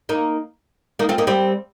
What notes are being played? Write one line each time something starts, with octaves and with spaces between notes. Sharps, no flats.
A#3 D#4
A#3 D#4
C4 F4
A#3 D#4
G3 C4